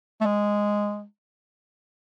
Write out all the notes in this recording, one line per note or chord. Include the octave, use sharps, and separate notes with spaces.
A3
G#3